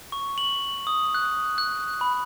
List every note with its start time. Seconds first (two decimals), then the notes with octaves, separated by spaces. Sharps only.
0.12 C#6
0.38 F#7
0.87 D#6
1.14 F#6
1.58 F#6
2.01 B5